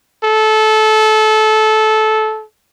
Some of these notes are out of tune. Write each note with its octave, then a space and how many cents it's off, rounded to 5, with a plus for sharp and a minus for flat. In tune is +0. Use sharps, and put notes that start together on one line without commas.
A4 -20